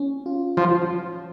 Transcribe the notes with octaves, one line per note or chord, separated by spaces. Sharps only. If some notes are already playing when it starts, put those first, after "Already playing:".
Already playing: C#4
F4
F3